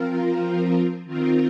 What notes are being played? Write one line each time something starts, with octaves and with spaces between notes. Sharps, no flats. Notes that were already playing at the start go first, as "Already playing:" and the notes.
Already playing: F3 C4 F4 A#4
D#3 C4 F4 A#4